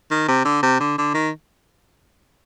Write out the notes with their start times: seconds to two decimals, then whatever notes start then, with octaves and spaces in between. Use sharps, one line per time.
0.11 D#3
0.28 C3
0.45 D3
0.63 C3
0.80 D3
0.98 D3
1.14 D#3